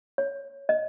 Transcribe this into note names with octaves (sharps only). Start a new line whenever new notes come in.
C#5
D#5